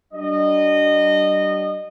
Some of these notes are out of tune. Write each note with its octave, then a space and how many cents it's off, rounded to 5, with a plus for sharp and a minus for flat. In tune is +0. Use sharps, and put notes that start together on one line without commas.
G3 -35 D4 +0 D#5 -20